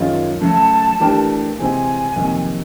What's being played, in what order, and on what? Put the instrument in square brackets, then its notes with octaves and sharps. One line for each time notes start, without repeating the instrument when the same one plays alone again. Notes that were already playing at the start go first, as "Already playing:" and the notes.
Already playing: [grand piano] F#2 D#3 G#3 C#4 F4
[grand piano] C#3 F#3 A3 [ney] A5
[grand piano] E3 A3 D4 G4 A#4
[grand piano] C3 E3 G#3 C4 [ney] G#5
[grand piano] F2 C3 D#3 F#3 A#3